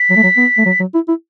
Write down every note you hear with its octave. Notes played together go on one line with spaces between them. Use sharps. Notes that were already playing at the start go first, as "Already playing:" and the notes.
Already playing: B6
F#3
A3
F#3
B3
A3
F#3
F#3
E4
E4